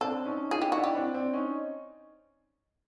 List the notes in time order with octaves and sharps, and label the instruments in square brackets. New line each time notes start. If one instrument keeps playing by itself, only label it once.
[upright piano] C4 D4 [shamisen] A4
[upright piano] C#4 D#4
[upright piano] D#4 F4 [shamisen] G#4
[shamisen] G4
[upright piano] D4 E4 [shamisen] F#4
[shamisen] G4
[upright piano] C4 D4
C4 D4
C#4 D#4